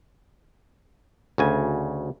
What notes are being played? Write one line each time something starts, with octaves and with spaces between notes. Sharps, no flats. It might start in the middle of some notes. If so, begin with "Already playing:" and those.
D2 C#3 G#5